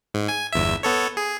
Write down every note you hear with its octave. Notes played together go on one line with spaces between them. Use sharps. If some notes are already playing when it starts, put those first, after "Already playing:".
G#2
G#5
G1 E2 E5
B3 A4 C#5
G#4